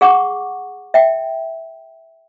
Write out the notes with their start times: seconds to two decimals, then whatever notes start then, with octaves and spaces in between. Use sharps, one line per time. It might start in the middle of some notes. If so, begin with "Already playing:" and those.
0.01 G#4 F#5 C#6 D6
0.94 E5 G5